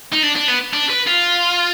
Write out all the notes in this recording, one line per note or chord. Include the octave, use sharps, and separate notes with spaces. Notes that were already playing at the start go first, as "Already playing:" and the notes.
D#4
D4
D4
B3
D4
B4
F4